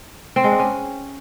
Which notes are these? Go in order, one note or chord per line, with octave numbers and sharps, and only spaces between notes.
C4
G#3
D4
C#4